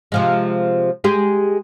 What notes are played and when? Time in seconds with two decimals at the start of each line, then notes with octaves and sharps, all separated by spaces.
0.12 C3 F3 G#3
1.04 G#3 G4 G#4